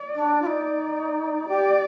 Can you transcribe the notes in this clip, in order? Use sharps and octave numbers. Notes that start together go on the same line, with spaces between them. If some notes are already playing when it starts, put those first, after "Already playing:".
Already playing: D5
D4
F4
D#4
G4 D5